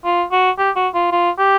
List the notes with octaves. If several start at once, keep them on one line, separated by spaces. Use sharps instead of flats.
F4
F#4
G4
F#4
F4
F4
G4